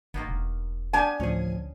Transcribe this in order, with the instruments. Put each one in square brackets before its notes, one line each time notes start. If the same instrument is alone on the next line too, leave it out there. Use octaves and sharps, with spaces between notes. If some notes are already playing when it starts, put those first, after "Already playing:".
[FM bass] G#1 [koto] D#3 A#3 B3
[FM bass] E1
[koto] B3 D4 G4 [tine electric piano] F#5 [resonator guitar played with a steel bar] G#5
[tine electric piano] A1 F3 [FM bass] D2 [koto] C#4 G#4